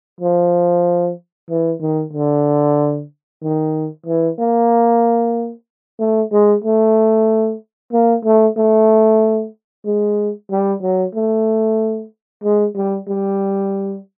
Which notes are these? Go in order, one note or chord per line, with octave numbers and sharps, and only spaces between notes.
F3
E3
D#3
D3
D#3
E3
A#3
A3
G#3
A3
A#3
A3
A3
G#3
G3
F#3
A3
G#3
G3
G3